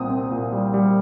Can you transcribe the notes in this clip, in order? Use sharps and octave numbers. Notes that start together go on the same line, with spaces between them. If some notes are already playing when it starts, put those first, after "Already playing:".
Already playing: C2 A#2 C4 D#6
C4
A#2
G3
G3